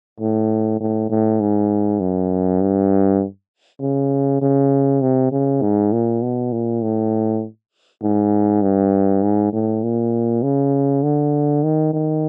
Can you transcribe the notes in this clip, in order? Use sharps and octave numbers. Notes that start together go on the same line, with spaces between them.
A2
A2
A2
G#2
F#2
G2
C#3
C#3
C3
C#3
G#2
A#2
B2
A#2
A2
G#2
G2
G#2
A2
A#2
C#3
D3
D#3
D#3